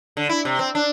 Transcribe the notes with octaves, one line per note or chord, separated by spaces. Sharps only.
D3
E4
C3
C4
D4